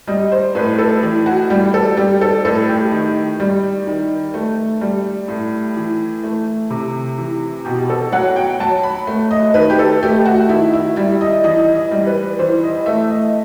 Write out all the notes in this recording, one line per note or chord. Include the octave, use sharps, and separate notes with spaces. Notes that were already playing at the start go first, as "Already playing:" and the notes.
G3 D#5
C5
A2 B4
A4
E3
F#4
G3 G4
A4
G3 G4
A4
A2 A4
G4
D#3
G3
D#3
A3
G3
A2
E3
A3
C3
E3
B2 G4
A4
F#3 F#5
G5
F#3 A5
B5
A3
D#5
D#3 B4
G4
A4
A3 G4
F#4
D#3 E4
E4
G3 E4
D#5
E3 D#5
D#5
G3
B4
E3 C5
D#5
A3 E5
D#5